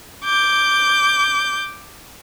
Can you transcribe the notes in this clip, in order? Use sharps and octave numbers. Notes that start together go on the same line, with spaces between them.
D6 G6